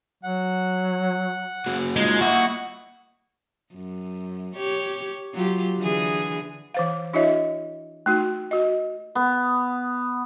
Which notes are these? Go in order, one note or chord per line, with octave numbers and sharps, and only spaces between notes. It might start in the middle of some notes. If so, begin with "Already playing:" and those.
F#3 F#5
A#3 F#4 G#4
G#3 D#4 F4
A#3 E4 F#4 D#5 E5
F#2
G4 C#5
F#3 F4 G4
D3 E3 G#4
E3 C5 F5
D4 E4 F#4 C#5 D#5 E5
A3 D#4 F#4
F#4 D#5
B3